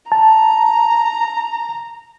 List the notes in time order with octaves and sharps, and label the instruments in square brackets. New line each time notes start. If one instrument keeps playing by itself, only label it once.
[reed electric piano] A5 [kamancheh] A#5